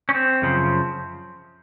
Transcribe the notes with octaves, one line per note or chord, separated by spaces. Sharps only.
C#4
C4
F#2 C#3 F3